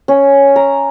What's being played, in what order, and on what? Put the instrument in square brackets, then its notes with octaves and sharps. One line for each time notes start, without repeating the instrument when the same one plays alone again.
[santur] C#4
A#5